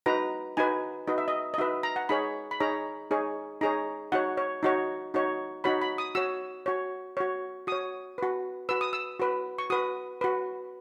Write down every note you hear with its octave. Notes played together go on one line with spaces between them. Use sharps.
D#4 F#4 B4 A#5
D#4 F#4 B4 G#5
D#4 F#4 B4 D#5
E5
D#5
D#5
D#4 F#4 B4 E5
A#5
F#5
D#4 G#4 C#5 B5
B5
D#4 G#4 C#5 A#5
D#4 G#4 C#5
D#4 G#4 C#5 A#5
D#4 F#4 C#5 F#5
C#5
D#4 F#4 C#5
D#4 F#4 C#5
D#4 F#4 C#5 B5
B5
D#6
F#4 C#5 E6
F#4 C#5
F#4 C#5
F#4 C#5 D#6
F#4 B4
F#4 B4 E6
D#6
E6
F#4 B4
C#6
F#4 B4 D#6
F#4 B4